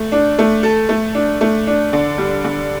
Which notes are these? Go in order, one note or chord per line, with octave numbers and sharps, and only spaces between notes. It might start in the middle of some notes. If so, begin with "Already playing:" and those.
Already playing: A3
D4
A3
A4
A3
D4
A3
D4
D3
G3
D3